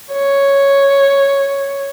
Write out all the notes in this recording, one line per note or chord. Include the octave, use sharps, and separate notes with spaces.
C#5